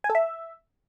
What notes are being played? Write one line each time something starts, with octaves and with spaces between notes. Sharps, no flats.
G#5
A4
E5